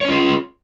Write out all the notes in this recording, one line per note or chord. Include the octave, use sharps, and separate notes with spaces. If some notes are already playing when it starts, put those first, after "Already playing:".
C#4 F4 G#4 C#5